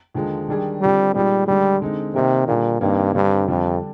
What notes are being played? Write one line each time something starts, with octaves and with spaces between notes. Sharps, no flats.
D#2 D3 F3 G#3
D#3 G3 D4 G#4
D3 F3 G3 C4 G4
A#2 G3 G#3 D#4 G#4
D#2 D3 G3 G#3
D3 G#3 C4 D#4
C3 D#3 A#3 D#4 A#4
A#2 D3 G3 D4 G#4
G2 C3 D#3 A#3 D#4
G2 D3 G3 C4 G4
F2 D3 G3 D4